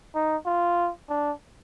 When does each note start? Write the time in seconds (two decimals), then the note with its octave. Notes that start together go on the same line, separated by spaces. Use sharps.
0.15 D#4
0.46 F4
1.09 D4